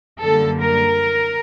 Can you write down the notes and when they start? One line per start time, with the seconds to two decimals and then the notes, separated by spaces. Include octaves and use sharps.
0.22 F#2 D3 G3 A#3 A4
0.62 A#4